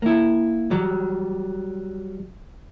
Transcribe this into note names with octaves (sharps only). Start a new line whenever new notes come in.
A#3 E4
F#3 G3